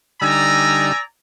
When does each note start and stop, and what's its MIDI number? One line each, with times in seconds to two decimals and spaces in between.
0.21 0.92 50
0.21 0.92 55
0.21 0.92 63
0.21 0.98 74
0.21 0.98 80
0.21 0.98 82
0.21 1.01 88